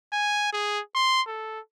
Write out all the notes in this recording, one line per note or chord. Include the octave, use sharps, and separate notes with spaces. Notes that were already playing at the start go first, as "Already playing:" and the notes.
G#5
G#4
C6
A4